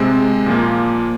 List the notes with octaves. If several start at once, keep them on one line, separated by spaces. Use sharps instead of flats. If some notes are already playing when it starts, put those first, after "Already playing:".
Already playing: C3 G#3 C4
A#2 F3 A#3